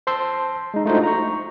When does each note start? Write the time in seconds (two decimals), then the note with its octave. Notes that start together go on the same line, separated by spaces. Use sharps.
0.07 C5 A5 C6 E6
0.74 G#3 D#4
0.85 A3 D4 D#4 F4 F#4 C5
1.03 A#5 C#6